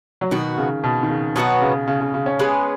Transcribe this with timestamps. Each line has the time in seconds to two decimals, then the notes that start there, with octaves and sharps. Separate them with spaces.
0.21 F#3
0.31 B2 D#3 B3 F#4
0.58 C#3
0.84 B2
1.03 D#3
1.09 C#3
1.36 B2 F#3 B3 F#4 B4
1.61 C#3
1.87 C#3
2.01 C#3
2.14 C#3
2.26 C#4
2.39 G#3 B3 G#4 B4